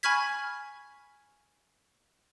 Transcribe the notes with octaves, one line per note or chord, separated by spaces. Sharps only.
G#5 B5 C#6 F6 G#6 B6